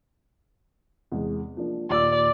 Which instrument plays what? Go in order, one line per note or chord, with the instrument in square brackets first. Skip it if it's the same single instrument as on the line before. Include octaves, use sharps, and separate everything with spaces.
[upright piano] E2 C3 G#3
F3 A#3 D4
[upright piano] D#2 A#2 E6 [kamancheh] D5